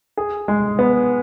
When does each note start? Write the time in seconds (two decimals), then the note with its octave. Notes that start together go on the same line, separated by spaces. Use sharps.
0.17 G#4
0.48 G#3
0.79 B3